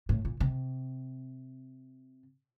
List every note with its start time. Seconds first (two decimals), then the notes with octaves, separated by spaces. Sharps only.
0.09 A2
0.25 A#2
0.40 C3